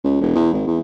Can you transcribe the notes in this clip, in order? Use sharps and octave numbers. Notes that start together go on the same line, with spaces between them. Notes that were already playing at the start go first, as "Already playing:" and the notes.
C#2
E1
E2
G#1
E2